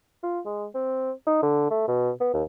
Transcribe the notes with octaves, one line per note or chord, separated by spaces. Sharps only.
F4
G#3
C4
D#4
D3
A3
B2
B3
D#2